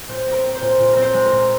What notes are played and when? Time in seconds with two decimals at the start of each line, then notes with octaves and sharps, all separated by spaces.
0.08 A#2 C5
0.26 C4
0.32 A#4
0.44 C4
0.55 C5
0.61 A#2
0.79 A#2
0.93 C4 A#4
1.02 C5
1.14 G#3
1.26 A#4
1.32 A#2